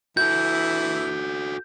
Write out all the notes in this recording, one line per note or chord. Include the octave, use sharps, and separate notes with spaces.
E3 E4 F#4 A4 G6